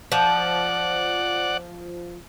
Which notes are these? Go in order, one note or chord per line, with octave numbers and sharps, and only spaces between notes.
F3 D5 F#5